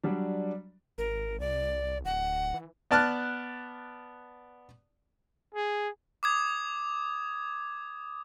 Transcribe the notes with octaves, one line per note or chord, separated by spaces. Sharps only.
F#3 G3 D4
G#1 A#4
C2 D5
D1 F#5
E3
B3 D5 A5 F6 F#6
G#4
D6 D#6 G#6